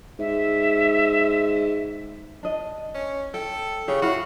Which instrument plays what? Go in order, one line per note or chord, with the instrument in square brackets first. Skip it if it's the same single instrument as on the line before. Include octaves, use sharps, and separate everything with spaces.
[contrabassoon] G#2 [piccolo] E5
[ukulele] D4 D#5
[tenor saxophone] C#4
[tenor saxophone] A4 [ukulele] G5
[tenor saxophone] C#3 [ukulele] G4 C#5
[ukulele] E4 F5 [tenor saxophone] F#4